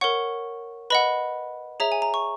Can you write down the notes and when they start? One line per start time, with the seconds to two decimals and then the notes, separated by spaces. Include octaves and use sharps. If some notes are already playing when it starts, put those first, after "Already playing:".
0.01 A#4 C#5 F#5 C#6
0.90 B4 D#5 F#5 B5
1.80 G#4 C#5 E5 A#5
1.92 G#5
2.02 A#5
2.14 C#6